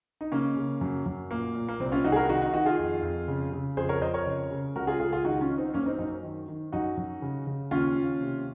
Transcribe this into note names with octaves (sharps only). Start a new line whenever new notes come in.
D#4
C#3 A#3 C#4
C#3
F#2
F#2
A#2 A#3
A#2
A#3
C2 C4
C#4 F4
C2 D#4 F#4
G#4
F#4 A#4
D#3 D#4 F#4
D#4 F#4
D#3 D#4 F#4
F4 G#4
F2
F2
C#3
C#3
F2 G#4 C5
A#4 C#5
F2 C5 D#5
A#4 C#5
C#3
C#3
C#2 F#4 A#4
F4 G#4
C#2 F4 G#4
F4 G#4
D#3 D#4 F#4
C#4 F4
D#3
C4 D#4
F#2 A#3 C#4
C4 D#4
F#2 C4 D#4
D#3
D#3
F#2 D#4 F#4
F#2
C#3
C#3
D#2 C#4 F4
D#2
C3